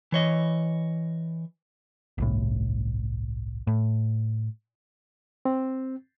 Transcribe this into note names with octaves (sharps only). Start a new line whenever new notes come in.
E3 C#5 D#5
G1 C2 A2
A2
C4